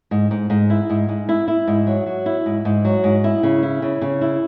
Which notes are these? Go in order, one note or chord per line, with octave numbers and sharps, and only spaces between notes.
G#2
G#2
G#2
E4
G#2
G#2
E4
E4
G#2
F#3
F#3
E4
G#2
G#2
F#3
G#2
E4
C#3
E4
C#3
C#3
E4